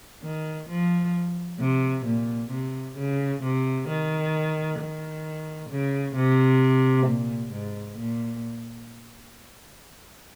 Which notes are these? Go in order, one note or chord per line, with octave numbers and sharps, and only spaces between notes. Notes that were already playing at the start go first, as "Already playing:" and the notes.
D#3
F3
C3
A#2
C3
C#3
C3
D#3
D#3
C#3
C3
A#2
G#2
A#2